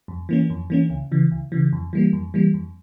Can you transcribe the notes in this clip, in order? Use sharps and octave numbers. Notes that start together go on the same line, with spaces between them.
F2
E3 A#3 C#4
F2
E3 A#3 C#4
C#2
C#3 E3
C#2
C#3 E3
F2
E3 G3 A#3
F2
E3 G3 A#3
F2